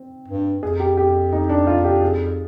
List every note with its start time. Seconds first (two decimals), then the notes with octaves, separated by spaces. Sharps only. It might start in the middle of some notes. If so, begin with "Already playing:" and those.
Already playing: C4
0.28 G2
0.62 F2 G#4
0.80 G4
0.97 G4
1.32 D#4
1.50 D4
1.67 F4
1.85 G4
2.02 G#4